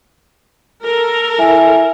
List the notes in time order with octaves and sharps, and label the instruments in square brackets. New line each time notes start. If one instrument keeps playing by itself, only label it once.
[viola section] A4 A#4
[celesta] E4 E5 G#5